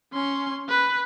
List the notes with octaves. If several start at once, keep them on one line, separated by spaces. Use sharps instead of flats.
C#4 C6
B4